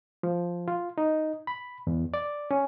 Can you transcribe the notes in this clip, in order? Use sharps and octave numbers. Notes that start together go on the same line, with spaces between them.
F3
F4
D#4
B5
E2
D5
C#4